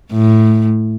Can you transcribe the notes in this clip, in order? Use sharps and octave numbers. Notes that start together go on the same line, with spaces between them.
A2